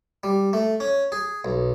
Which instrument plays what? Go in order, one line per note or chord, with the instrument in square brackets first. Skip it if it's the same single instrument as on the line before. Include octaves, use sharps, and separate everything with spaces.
[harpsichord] G3
A3
C#4
G#4
B1